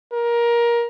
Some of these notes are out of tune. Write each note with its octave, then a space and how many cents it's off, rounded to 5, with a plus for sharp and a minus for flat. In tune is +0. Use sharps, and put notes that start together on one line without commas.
A#4 +20